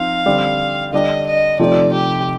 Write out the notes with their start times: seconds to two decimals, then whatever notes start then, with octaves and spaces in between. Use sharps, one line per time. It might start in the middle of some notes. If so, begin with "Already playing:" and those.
Already playing: F3 C4 D#4 F5
0.26 D3 G3 C4
0.92 D3 G3 D4 D#5
1.26 D#5
1.59 C3 F3 A3 D#4 D5
1.93 G4